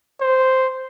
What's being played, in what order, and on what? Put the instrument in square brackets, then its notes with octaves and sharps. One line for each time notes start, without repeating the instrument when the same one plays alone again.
[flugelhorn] C5